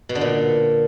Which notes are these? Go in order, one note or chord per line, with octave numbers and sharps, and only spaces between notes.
B2
D3
A#2